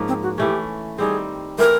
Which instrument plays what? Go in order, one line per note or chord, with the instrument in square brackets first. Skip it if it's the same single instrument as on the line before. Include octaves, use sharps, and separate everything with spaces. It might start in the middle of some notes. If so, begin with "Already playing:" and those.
Already playing: [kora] G#2 F3 A#3 C#4
[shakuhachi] C4
F#4
[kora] E3 A3 C#4 [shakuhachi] G4
[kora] D#3 G3 C4 [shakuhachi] G#4
[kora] E3 A3 C4 E4 [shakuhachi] A#4